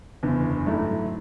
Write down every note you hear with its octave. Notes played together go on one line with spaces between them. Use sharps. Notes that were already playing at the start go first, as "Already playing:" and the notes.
F#1 E2 D3
G#2 F#3 A3 E4